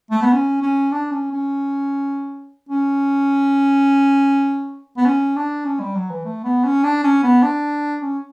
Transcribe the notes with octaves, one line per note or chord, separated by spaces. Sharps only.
A3
B3
C#4
C#4
D4
C#4
C#4
C#4
B3
C#4
D4
C#4
G3
F#3
E3
A3
B3
C#4
D4
C#4
B3
D4
C#4